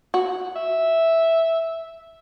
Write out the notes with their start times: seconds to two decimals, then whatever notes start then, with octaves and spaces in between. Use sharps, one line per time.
0.14 F#4
0.56 E5